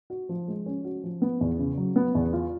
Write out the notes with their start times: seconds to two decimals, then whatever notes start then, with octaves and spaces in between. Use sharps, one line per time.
0.10 F#4
0.29 F3
0.48 G#3
0.66 C#4
0.85 F#4
1.04 F3
1.22 B3
1.41 E2
1.59 C#3
1.77 F#3
1.96 B3
2.15 E2
2.33 F4